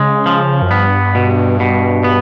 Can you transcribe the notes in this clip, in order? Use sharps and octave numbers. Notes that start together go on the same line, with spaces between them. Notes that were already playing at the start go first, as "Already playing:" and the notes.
Already playing: C#3 G#3
F3
F#2
G2 B3
B2
B2
B3